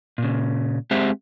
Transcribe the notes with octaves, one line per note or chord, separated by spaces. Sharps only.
A#2 C#3
G#3 C4 G4 C5 E5 F#5